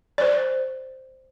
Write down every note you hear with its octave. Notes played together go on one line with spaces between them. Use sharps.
C5 D5